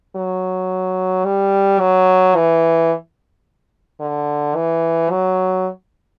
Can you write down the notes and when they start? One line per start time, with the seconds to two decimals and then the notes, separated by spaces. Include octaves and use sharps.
0.16 F#3
1.25 G3
1.80 F#3
2.36 E3
4.00 D3
4.55 E3
5.11 F#3